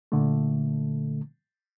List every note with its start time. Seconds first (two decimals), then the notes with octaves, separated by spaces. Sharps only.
0.12 A#2 D3 A3